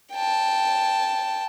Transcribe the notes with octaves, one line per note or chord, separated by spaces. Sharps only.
G5 A5